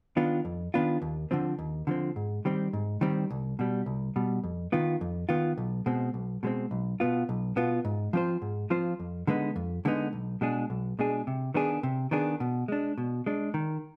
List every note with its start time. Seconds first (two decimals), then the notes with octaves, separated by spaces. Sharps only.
0.17 D#3 B3 D4 F4
0.45 F2
0.74 D#3 B3 D4 F4
1.02 D#2
1.31 D3 F3 C4
1.59 D#2
1.87 D3 F3 C4
2.16 G#2
2.45 D#3 G3 C4
2.73 G#2
3.01 D#3 G3 C4
3.31 C2
3.59 B2 G3
3.86 C2
4.16 B2 G3
4.44 F2
4.72 D#3 B3 F4
5.01 F2
5.29 D#3 B3 F4
5.58 B1
5.86 B2 G#3 C4
6.14 B1
6.43 B2 G#3 C4
6.71 B1
7.00 B2 B3 F4
7.29 B1
7.56 B2 B3 F4
7.85 G#2
8.13 F3 C4 F4 C5
8.42 G#2
8.70 F3 C4 F4 C5
9.00 F2
9.27 D3 G#3 B3 D#4
9.56 F2
9.85 D3 G#3 B3 D#4
10.13 B1
10.41 B2 G#3 D4 G#4
10.70 B1
10.99 B2 G#3 D4 G#4
11.27 C3
11.54 D#3 B3 D4 G#4
11.83 C3
12.11 D#3 B3 D4 G#4
12.40 B2
12.68 G#3 D4
12.98 B2
13.26 G#3 D4
13.54 D#3